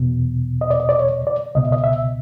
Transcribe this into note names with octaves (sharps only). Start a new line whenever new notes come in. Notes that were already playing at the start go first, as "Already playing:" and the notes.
Already playing: E2 B2
D#5
D5
D#5
D5
C#5
D5
C#2 B2 D#5
E5
D#5
E5